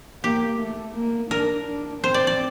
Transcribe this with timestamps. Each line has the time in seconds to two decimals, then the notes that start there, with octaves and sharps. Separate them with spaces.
0.24 A#3 G4
0.60 A3
0.95 A#3
1.31 D4 A#4
1.67 D4
2.03 C4 C5
2.14 D5
2.27 D5